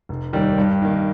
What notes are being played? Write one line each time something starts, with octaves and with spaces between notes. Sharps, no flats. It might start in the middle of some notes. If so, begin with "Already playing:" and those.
F1
D#2 D#3 G3 A#3
G2
D#3 A#3